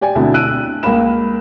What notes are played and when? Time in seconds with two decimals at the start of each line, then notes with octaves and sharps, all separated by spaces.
0.01 G4 D5 G5 G#5
0.15 D2 B2 D3 C4 E4 A5
0.34 E6 F#6 D7 D#7
0.83 C#2 A#3 A#4 F5 B5 E7